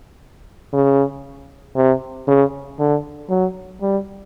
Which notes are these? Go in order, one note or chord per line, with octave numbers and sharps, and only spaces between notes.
C#3
C3
C#3
D3
F#3
G3